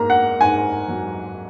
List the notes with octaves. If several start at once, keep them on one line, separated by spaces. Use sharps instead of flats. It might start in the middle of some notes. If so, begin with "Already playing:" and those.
Already playing: G#2 A#3 A#5
F#5
G#2 G#5
F#3